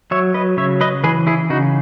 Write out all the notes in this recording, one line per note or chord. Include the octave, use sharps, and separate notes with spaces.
F#3 C#5 E5
B4 D#5
C#3 C#5 E5
B4 D#5
E3 G#4 B4
E4 G#4
C#3 D#4 F#4